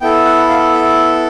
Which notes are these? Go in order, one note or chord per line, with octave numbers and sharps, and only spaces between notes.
B3 E4 A4 G5
F#5
F5
E5